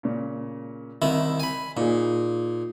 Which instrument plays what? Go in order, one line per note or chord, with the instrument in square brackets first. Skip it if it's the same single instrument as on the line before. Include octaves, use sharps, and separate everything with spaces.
[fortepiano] A#2 C#3
[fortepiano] C2 C3 [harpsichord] D#3 E4
[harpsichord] G#5 B5
[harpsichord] A#2 [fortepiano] D#4 G#4